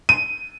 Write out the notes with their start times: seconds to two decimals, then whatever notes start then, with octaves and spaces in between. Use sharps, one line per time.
0.09 D#7